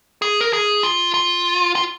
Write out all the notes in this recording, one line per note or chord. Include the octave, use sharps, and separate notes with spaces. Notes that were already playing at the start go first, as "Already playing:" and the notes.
G#4
A#4
G#4
F4
F4
F4